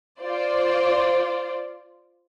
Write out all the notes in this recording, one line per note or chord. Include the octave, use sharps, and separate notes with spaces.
F4 C5 D5